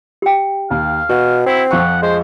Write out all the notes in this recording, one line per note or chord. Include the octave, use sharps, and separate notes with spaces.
G4 G5
D#2 F5
B2 F#4
C4 E4
F2 F3 F#5 C#6
G#3 C5